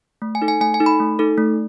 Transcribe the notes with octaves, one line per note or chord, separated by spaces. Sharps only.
A3
G#5
D#4 A4
G#5
A3 G#5
G#5
D#4 A4
B5
A3
D#4 A4
A3